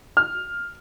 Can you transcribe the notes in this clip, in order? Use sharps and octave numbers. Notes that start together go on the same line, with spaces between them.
F6